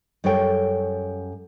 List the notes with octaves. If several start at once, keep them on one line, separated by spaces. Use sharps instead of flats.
F#2 G3 A4 C#5 G5